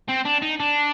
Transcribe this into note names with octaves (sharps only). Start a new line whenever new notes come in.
C4
D4
D#4
D4